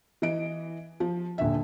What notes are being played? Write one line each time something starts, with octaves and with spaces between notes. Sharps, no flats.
E3 D#5 D7
F3
D#1 D3 E5